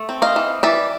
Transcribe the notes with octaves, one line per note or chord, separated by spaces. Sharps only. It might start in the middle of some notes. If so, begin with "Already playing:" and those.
Already playing: A3
C4
D#5 F5
E3
E3 D5 E5